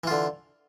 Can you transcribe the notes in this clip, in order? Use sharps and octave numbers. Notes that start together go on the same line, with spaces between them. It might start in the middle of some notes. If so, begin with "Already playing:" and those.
D3 E3 F4